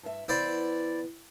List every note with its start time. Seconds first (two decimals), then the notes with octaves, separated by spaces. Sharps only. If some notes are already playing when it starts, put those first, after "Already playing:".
0.03 G2 E5
0.29 E3 B3 E4 C5 D5